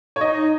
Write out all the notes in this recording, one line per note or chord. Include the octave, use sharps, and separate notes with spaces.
C#5
D#4 D#5